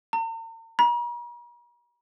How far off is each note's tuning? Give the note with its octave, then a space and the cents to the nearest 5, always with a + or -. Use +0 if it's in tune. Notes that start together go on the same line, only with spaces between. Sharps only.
A#5 -45
A#5 +45